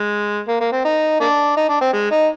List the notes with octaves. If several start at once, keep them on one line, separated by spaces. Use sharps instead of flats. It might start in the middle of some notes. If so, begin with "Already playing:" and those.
Already playing: G#3
A#3
A#3
C4
D#4
A#3 D4
D#4
D4
C4
G#3
D#4